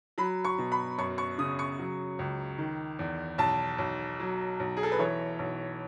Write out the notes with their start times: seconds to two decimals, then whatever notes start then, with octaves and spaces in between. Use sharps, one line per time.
0.18 F#3 B5
0.45 C#6
0.58 B2
0.72 B5
0.98 F#2 C#6
1.18 C#6
1.38 C#3 D#6
1.59 C#6
1.79 F#3
2.19 C#2
2.58 D#3
2.99 E2
3.38 B1 A5
3.78 B1
4.20 F#3
4.60 B1
4.77 G#4
4.83 A4
4.92 B4
4.99 E3 C#5
5.39 B1